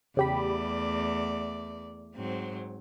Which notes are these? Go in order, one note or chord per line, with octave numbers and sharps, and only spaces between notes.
E2 C#3 A3 G4 D5 B5
G#2 F#3 C4